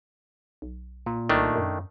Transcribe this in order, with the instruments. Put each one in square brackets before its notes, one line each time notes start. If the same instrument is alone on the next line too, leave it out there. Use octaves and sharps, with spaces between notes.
[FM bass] B1
[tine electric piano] A#2
[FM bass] C2 [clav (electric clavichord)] D#3 A3 D4
[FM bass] F#2